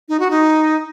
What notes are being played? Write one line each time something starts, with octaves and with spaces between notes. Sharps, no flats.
D#4
F#4
D#4